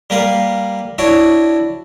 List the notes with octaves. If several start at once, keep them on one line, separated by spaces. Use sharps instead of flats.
G3 A#3 B4 F5
D4 E4 F#4 C#5 D5